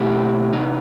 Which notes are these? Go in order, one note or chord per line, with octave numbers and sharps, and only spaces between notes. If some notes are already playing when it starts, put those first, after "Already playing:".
Already playing: B2 A3 C4 E4 G4
C3 E3 B3 D#4